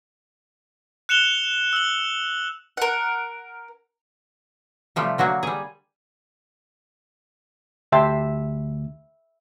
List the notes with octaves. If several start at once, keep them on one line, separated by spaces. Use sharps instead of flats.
F#6 C#7 E7 F7 G7
E6 F#7
A#4 F#5
C3 F3 G3 A3
D3 F#3 A#3 F#4
G3 G#4
D2 G4 E5 G5 A5 C6